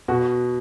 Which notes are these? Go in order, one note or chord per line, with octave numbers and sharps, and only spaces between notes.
B2 F#4